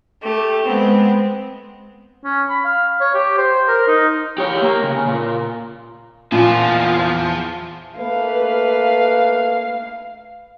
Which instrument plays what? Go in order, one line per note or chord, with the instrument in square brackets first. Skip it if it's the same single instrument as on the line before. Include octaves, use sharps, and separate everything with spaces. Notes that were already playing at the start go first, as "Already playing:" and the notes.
[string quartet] A3 G4
G#3 B3 C4
[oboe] C#4
B5
F5
C#5
G4
C5
A#4
D#4
[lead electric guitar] G4 C#5
A#3
C#3
A#2
[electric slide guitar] E2 G#5 A5 [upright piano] A#2 [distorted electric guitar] F3 [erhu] F4
[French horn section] A3 A#3 B4 [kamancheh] F5